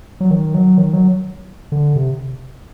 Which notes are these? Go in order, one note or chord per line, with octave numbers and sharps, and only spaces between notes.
F#3
D#3
F#3
D#3
F#3
D3
C3